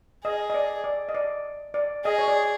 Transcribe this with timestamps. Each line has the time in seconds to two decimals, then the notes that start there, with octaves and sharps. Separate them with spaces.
0.24 G#4 D#5
0.50 D#5
0.54 D5
0.84 D5
1.09 D#5
1.15 D5
1.74 D5
2.05 G#4 D#5
2.19 C#5
2.28 D5